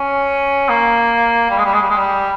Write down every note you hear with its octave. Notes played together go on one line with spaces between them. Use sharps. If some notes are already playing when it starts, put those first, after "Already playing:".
Already playing: C#4
A#3
G3
G#3
G3
G#3
G3
G#3
G3